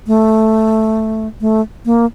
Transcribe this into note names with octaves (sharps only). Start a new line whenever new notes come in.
A3
A3
A#3